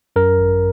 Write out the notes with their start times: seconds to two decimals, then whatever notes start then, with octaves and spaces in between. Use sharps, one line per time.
0.16 F#2 A#4
0.38 G#1